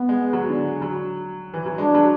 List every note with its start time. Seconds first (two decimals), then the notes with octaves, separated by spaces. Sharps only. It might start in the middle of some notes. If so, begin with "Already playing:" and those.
Already playing: B3
0.09 G#3
0.33 F#3
0.49 D3
0.82 F#3
1.54 E3
1.66 F#3
1.78 G#3 D4
1.95 F#3